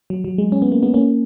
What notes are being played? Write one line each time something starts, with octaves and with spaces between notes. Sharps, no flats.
F#3
F#3
G#3
C#4
B3
A#3
G#3 B3
A#3 C#4